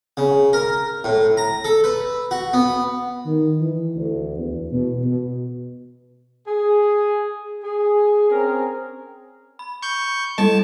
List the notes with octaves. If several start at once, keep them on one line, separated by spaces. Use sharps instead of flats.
C#3
A#4
A2
A#5
A4
B4
F#4
B3
D#3
E3
D2
E2
B2
B2
G#4
G#4
C4 C#4 G#4 A#4
B5
C#6 G6
G3 A4 D#5 A5